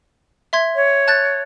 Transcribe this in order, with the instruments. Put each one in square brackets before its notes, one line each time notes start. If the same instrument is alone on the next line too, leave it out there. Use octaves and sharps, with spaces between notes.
[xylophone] E5 C6 G#6
[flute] C#5
[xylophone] A5 F#6 A6